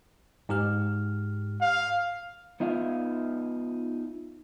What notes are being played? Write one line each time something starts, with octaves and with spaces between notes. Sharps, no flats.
G#2 G4 F6
F5
B3 D#4 F4 E5 F5